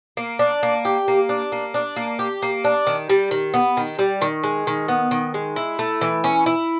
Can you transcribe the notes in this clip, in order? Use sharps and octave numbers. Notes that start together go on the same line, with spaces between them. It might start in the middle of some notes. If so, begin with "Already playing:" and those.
A#3
D4
A#3
G4
A#3
D4
A#3
D4
A#3
G4
A#3
D4
D#3
G3
D#3
B3
D#3
G3
D#3
G#3
D#3
B3
D#3
G#3
E4
A3
E3
C#4
E4